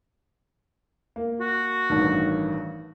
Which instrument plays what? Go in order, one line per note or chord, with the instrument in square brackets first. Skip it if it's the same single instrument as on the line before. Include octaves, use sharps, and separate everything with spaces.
[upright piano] A#3
[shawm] F#4
[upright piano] A1 G2 D#3